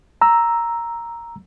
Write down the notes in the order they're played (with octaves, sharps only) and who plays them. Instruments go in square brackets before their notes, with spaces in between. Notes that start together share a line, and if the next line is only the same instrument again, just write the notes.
[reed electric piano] A#5 E6